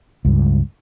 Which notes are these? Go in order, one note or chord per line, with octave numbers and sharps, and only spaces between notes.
C#2 G2